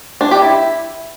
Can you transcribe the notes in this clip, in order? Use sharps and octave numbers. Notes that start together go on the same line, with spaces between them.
D4
G4
E4